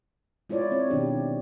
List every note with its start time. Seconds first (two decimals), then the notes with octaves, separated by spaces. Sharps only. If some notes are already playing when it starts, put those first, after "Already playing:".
0.49 G#3 E4 F4 C#5 D5
0.71 C4 C#5
0.90 B2 D#3 D4 G4